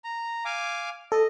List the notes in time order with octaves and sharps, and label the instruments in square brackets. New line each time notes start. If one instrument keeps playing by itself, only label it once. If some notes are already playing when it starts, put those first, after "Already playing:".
[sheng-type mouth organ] A#5
F5 G#5 D6
[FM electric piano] A4 [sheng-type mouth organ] D#5